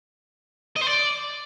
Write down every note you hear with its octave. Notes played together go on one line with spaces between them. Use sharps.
D#5
C5
D5